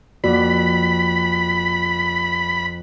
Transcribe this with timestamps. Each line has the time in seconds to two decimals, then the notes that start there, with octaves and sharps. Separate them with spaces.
0.24 F2 A#3 F#4 D5 B5